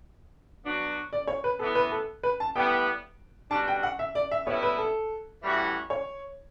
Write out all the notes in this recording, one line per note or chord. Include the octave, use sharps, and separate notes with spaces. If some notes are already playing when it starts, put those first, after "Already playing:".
F#3 B3 D4 F#4
D5
C#5
B4
A2 E3 B3 A4
B4
A4
B4
A5
A2 G3 B3 G5
B2 G3 D4 F#4 A5
G5
F#5
E5
D5
E5
A2 G3 B3 E4 C#5
B4
A4
A2 E3 G3 C#4 F#4
C#5